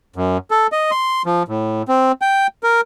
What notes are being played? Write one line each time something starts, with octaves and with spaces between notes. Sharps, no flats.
F#2
A4
D#5
C6
F3
A2
C4
G5
A#4